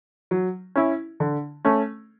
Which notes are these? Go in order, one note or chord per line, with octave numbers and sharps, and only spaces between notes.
F#3
C#4 E4
D3
A3 C#4